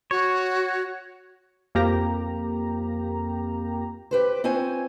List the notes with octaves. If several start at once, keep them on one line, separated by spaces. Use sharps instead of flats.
F#4 C#5
F2 A#3 G4 A#5
G4 B4 C5
C4 C#4 F4 C5 G#5